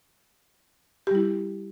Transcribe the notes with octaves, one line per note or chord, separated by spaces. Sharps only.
G3 E4 G4